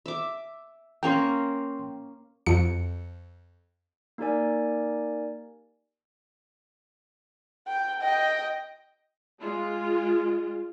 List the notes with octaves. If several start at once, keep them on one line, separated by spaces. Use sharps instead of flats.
E5 D6
A#3 C#4 A#4 G5 C6
F2 C#7
A#3 D#4 G4 A#4 D5 G#5
G5
D#5 G5
G#3 F4